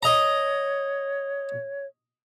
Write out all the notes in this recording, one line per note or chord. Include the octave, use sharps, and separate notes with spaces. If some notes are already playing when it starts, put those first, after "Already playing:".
C#5 D#5 A#5